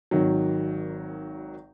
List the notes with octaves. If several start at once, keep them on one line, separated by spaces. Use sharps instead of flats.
G#1 D#3 F#3